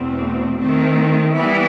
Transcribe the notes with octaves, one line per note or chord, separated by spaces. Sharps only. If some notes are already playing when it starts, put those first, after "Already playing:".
Already playing: E2 B2 A3 C4
D#3 A3 C4
E3 G3 B3 E4